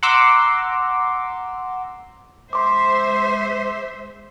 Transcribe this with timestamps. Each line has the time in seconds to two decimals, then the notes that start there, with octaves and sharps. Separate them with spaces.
0.03 F#5 A#5 C6 D6 E6
2.53 G#3 C5 E5 C6 D6